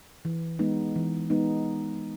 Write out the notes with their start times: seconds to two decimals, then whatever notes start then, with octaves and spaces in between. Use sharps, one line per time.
0.25 E3
0.59 G#3 B3 D#4
0.96 E3
1.30 G#3 B3 D#4